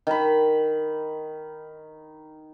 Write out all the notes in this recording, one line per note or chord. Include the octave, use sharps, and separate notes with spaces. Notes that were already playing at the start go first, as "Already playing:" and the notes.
D#3 B5